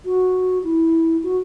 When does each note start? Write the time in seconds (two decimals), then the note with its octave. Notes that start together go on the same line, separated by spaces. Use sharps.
0.05 F#4
0.64 E4
1.23 F#4